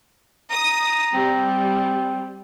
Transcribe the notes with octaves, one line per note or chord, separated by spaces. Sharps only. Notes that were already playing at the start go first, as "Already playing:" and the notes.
A#5 D#6
G3 C4